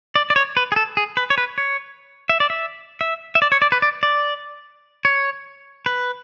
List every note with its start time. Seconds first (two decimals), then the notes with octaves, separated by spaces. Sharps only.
0.15 D5
0.30 D5
0.36 C#5
0.57 B4
0.72 G#4
0.76 A4
0.97 G#4
1.17 B4
1.30 C#5
1.38 B4
1.58 C#5
2.29 E5
2.40 D5
2.50 E5
3.01 E5
3.35 E5
3.42 D5
3.52 C#5
3.62 D5
3.72 B4
3.82 D5
4.03 D5
5.05 C#5
5.86 B4